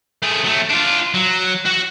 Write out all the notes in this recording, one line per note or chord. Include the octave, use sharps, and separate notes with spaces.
A3 G#4
F#3 A3
D4 F4
F#3
F#4 F#5